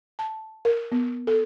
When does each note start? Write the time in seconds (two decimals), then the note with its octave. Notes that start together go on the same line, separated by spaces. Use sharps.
0.19 A5
0.65 A#4
0.92 B3
1.27 A4